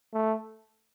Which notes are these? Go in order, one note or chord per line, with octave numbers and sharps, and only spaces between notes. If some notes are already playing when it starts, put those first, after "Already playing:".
A3